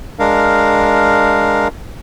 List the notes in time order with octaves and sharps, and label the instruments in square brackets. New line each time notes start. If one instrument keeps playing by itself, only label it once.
[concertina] G#3 D4 A#4 F5